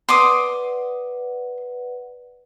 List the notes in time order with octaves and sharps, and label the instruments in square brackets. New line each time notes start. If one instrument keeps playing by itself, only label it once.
[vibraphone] B4 D5 F#5 [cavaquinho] C6 D6 D#6